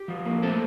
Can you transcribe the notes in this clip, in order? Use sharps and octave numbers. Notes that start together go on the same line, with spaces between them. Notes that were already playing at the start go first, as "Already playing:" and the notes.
Already playing: G4
F3
A#3
A3 C4 A4